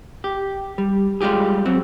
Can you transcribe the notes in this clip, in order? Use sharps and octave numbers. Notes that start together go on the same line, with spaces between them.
G4
G3
G3 G#3 F4 G4 G#4
F#3 C4